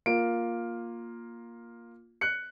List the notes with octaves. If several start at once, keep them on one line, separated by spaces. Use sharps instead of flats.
A#3 F4 D7
F#6 C#7